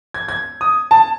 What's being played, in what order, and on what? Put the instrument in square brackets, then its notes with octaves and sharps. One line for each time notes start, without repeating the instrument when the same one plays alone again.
[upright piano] G#6
G#6
D#6
A5